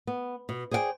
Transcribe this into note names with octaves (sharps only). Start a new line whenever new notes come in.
B3
B2
G#4 C5 D5 E5 G5 G#5